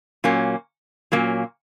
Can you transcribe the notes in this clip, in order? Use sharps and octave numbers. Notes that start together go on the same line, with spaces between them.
A#2 F#3 A#3 C#4
A#2 F#3 A#3 C#4